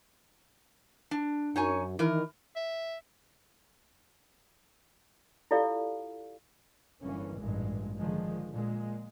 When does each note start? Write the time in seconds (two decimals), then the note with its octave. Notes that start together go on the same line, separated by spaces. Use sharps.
1.11 D4
1.56 F#2 D#4 C#5 G#5
1.99 D#3 E3 E4 A#4
2.56 E5
5.51 E4 F4 G4 A4 D5 F5
7.02 G1 E3 A#3 C#4
7.38 A1 G2 A#2 G#3
7.98 D3 D#3 F3 G#3
8.52 A#2 G#3